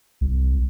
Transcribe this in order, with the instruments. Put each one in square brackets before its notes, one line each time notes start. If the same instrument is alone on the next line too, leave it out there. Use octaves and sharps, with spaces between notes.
[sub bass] C2